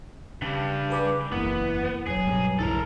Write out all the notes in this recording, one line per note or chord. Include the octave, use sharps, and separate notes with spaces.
G2 C#3 G3
G#4 B4 D6
F#1 E2 A#3 B3 E4
E1 F#3 G#4
G2 B2 G3
B1 F2 G#2 E3 E4 A4 A#4